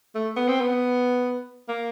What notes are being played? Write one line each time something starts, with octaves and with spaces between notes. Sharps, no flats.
A3
B3
C4
B3
A#3